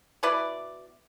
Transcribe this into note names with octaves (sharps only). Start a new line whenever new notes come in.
B2 E4 B4 D5